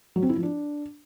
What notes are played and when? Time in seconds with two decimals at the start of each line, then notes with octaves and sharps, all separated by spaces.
0.16 F#3
0.23 C4
0.29 E4
0.36 F3
0.43 D4